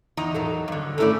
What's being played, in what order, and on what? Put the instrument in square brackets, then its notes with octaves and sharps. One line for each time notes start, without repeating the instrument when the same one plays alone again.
[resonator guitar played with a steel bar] E2 D#4 A#5
[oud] D#3 F#3 A4
[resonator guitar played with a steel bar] G2 D3
[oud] D#3 A3 [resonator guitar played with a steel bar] C#4 E4 D5 [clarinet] A4